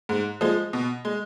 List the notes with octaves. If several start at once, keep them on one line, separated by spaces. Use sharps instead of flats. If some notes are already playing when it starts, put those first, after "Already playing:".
G#2
F3 G#3
B2
G#3